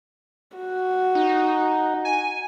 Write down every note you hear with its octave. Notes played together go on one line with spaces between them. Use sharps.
F#4
D#4
G#5